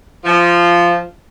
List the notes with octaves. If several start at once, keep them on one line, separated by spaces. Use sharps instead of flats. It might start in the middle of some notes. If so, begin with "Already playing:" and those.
F3